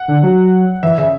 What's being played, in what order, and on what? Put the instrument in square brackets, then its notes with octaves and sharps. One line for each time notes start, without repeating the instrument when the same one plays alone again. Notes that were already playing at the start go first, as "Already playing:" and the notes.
Already playing: [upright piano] F#5
[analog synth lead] D3
F#3
[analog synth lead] E3 [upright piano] E5
[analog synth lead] C#3 [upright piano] E5